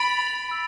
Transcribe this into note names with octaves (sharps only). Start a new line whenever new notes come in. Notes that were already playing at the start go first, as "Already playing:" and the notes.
Already playing: B5 A6 D7 F7
E6